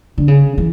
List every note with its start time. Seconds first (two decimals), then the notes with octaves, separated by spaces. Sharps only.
0.18 D3
0.28 C#3
0.58 E3